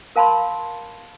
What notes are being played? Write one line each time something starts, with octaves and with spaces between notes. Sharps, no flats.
A#4 F5 A5 B5 C6